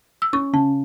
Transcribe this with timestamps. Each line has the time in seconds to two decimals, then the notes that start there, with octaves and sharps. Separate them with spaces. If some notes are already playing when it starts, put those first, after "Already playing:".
0.22 E6
0.33 C#4 C#6
0.53 C#3 A5